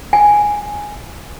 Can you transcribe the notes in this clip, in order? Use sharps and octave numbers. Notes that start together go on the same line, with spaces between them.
G#5